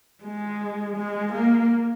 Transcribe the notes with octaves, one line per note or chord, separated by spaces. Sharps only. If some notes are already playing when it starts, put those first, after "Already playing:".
G#3
G#3
A#3